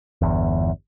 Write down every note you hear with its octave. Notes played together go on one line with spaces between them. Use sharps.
G1 E2